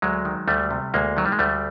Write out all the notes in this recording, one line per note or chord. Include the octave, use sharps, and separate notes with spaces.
D2 F#3 G#3
D#3
D2 G3 A3
C3
D2 G#3 A#3
D#3 F#3
G3
G#3
D2 G3 A3